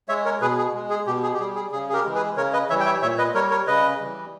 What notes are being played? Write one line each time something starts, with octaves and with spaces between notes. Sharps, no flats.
G#3 C#5 E5
A#4 C#5
B2 G#4 B4
G#4
G#3
G#4
B2 G4
G#4
G4
G3 G#4
G#4
C#3 G#4
G#4
G4 A#4
E3 G#3
G#4 B4
C#3 A#4 C#5
B4 D#5
E3 G3 C#5 E5
G5
C#5 E5
A#2 C#5 E5
B4 D#5
G3 A#4 C#5
A#4 C#5
C#3 B4 D#5
E3 G3